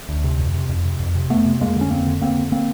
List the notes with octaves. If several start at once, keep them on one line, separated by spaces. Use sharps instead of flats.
D2
C3
F2
C3
F2
C3
F2
C3
F2 A3 B3
C3
F2 G#3 A#3
D3
C#4
F2 A#3 C4
D3
F2 A#3 C4
D3
A#3 C4